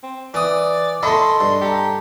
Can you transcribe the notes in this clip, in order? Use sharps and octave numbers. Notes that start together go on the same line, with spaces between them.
C4
E3 D5 D#6
A3 E4 A4 D#5 B5 C6
G2
G4 A4 A#5